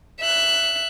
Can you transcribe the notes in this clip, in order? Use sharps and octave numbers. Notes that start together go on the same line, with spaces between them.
E5 F#6